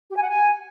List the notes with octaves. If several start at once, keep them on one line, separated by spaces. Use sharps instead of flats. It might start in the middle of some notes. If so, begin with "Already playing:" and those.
G4
G#5
F#5
G#5